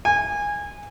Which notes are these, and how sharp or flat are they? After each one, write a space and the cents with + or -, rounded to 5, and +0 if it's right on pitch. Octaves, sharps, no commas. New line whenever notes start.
G#5 -20